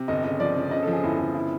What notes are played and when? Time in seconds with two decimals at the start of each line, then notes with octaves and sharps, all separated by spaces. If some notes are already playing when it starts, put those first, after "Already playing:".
Already playing: C3
0.08 G1 D#5
0.24 C#3 D#5
0.40 F3 D5
0.56 C#3
0.71 C#3 D#5
0.83 A4
0.87 F3
0.93 G#4
1.03 G1 E4
1.19 G1
1.35 E4